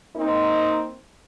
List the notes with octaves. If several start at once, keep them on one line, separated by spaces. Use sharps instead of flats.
A#3 C4 D#4